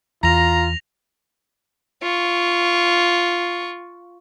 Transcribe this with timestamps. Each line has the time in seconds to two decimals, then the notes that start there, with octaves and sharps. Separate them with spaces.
0.23 E2 F4 A#5 A#6 F7
2.02 F4 C#6